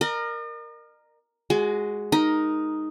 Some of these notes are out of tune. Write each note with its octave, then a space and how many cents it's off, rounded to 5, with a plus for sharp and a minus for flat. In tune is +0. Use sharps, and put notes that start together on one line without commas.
A#4 +0 D#5 -45
G#3 +0 F#4 +0 G#5 +35
D#4 +0 A#4 +10